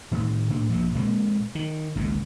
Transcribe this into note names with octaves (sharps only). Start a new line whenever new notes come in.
A2 D#3
A2 D4
A#1 G2 A#2 F3
A#2 G#3 A#3 C4
D#3
G#1 C#2 A#2